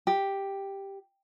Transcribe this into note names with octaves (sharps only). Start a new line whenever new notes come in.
G4